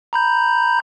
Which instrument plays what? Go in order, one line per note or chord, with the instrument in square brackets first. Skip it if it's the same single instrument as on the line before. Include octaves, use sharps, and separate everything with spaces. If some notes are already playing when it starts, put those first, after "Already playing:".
[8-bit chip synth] A#5 B5 G6